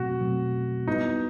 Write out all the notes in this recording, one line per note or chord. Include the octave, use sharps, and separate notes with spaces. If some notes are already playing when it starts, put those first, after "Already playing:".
Already playing: B2 F#3 A3 C4 F#4
B2 F#3 A3 C4
G3 B3 D#4 E4 B4